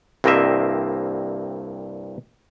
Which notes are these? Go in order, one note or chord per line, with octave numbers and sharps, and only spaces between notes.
C2 G2 A#3 C4 D#5 E5